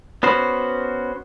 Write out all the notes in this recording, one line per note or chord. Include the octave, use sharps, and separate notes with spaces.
B3 C#4 F#4 C5